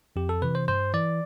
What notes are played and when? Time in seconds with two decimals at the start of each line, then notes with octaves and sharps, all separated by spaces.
0.16 F2 G4
0.29 A4
0.42 C3 E3 B4
0.55 C5
0.68 G2 C5
0.94 E3 D5